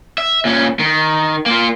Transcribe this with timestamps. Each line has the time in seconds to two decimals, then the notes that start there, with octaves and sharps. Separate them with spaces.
0.18 E5
0.45 A#2 C#4
0.79 D#3
1.46 A#3 F4